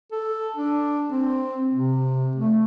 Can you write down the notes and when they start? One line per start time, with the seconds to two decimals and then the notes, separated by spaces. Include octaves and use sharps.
0.12 A4
0.56 D4
1.11 C4
1.74 C3
2.35 A3